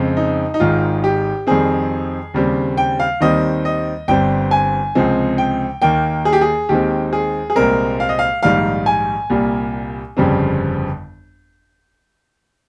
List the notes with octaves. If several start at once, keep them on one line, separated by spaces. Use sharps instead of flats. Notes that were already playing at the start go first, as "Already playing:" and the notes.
Already playing: F2 C#3 G#3 C4
D#4
D#4
G#1 G#2 D#3 G#3 F4
G4
F2 D#3 G3 C4 G#4
D#2 C#3 G3 C4
G5
F5
D#2 D#3 G3 C4 D#5
D#5
G1 G2 G3 C4 G5
G#5
C#2 C3 F3 G#3 C4
G5
D#2 D#3 A#3 G5
G#4
G4
G#4
D#2 D#3 G#3 C4 G4
G#4
G#4
C2 A#2 G#3 C4 A#4
F5
D#5
F5
A#1 G#2 D#3 G3 F5
G#5
C2 A#2 G3 A#3
G1 F2 C#3 G3 C4